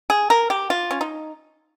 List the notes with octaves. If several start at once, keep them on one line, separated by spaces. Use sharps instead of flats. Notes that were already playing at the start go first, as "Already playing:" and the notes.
G#4
A#4
G4
F4
C#4
D#4